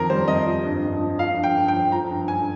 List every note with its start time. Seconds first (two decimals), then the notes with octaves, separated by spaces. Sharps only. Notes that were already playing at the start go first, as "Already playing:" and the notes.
Already playing: F2 D#3 F3 A#4
0.09 G3 C5
0.28 F2 D#5
0.46 F3
0.65 G2
0.83 G2
1.00 F3
1.19 F3 F5
1.37 G2
1.43 G5
1.55 G2
1.68 G5
1.73 F3
1.92 F3 A#5
2.11 G2
2.28 G2 G#5